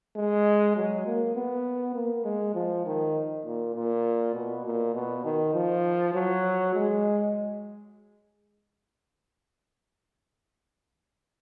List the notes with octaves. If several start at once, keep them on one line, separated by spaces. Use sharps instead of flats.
G#3
F#3
A#3
B3
A#3
G#3
F3
D#3
A#2
A#2
B2
A#2
B2
D#3
F3
F#3
G#3